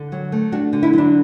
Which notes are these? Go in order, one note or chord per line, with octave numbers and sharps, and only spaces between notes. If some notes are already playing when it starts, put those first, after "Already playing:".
Already playing: D3
F#3
A3
D4 F#4
D3
E4
F#3 D4